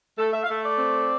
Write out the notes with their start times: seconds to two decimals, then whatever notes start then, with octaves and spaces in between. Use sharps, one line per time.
0.19 A3 A4
0.33 E5
0.44 F5
0.49 A3 E5
0.64 D5
0.79 C4